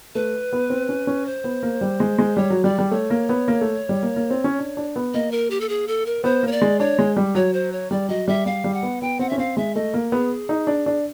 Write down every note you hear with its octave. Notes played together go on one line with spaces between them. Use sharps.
A3 B4
B3
C4
C#4
C#4
C5
B3
A#3
G3
G#3
G#3
G3 C#5
F#3
G3 D5
G3
A3 C#5
A#3
B3
A#3
A3
G3
A#3
A#3
C4
C#4
D4
D4
B3
A#3 D#5
A#4
G4
A4
G#4
A4
A#4
B3 C5
A#3 C#5
D5
G#3
D4 C#5
G#3
G3
F#3 C#5
C5
C#5
G3 D5
F#3 D#5
G3 E5
G3 F5
G3
F#5
B3
B3 G5
C4 F#5
C#4 E5
C4 F5
G#3 E5
A3 D#5
A#3
B3 G#4
D#4
D4
D4